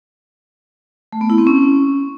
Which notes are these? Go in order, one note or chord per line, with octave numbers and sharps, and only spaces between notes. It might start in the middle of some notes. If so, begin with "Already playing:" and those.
A3
B3
E4
C4
C#4